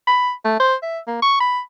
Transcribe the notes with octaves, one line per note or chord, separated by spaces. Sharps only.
B5
A3
C5
E5
A#3
C#6
B5